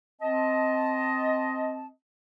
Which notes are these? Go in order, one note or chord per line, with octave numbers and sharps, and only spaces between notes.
C4 D#5 A5